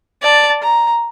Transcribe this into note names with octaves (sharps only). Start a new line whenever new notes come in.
D5 A5
A#5